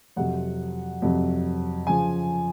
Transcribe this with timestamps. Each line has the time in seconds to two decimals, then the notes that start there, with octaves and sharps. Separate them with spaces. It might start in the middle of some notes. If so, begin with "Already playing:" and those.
0.16 F2 C3 F#3 F#5
1.02 F2 C3 F#3
1.87 C#3 F3 G#5